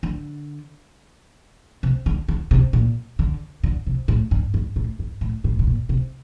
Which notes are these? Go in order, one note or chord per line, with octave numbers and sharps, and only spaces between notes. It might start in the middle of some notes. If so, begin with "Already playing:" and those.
D3
C3
D3
D3
C3
A#2
D3
D3
C3
A2
G2
G2
A2
G2
A2
A2
A2
A#2
C3